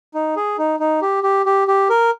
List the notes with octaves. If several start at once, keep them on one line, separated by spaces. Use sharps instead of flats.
D#4
G#4
D#4
D#4
G4
G4
G4
G4
A#4